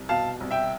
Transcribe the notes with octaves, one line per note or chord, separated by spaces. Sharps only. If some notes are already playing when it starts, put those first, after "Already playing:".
Already playing: C2
B2 F5 A5
C2
E5 G5